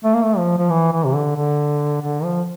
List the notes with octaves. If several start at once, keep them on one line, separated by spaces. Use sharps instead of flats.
A3
A#3
A3
F3
F3
E3
E3
C3
D3
D3
D3
F3